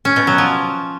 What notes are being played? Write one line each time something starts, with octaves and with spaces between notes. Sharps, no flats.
C#4
B2
F#3
F3